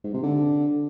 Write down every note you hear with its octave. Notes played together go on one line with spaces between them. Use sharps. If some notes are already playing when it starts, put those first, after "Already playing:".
G#2
C3
D3